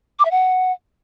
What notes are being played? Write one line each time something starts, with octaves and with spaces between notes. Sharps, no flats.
D6
E5
F#5